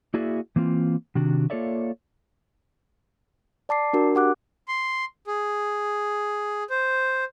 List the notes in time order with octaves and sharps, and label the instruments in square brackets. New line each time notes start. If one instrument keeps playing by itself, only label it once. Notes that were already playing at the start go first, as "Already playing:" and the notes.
[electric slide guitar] A#3 E4 F#4 G#4 D5 E5
E3 A#3 C4 F4
C3 D#3 D4 F#4
A#3 F4 A4 C#5 D5 E5
[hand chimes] D5 A5 D6 C7
D4 F#4 A#4
G4 F#5 D6 F#6
[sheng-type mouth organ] C6
G#4
C5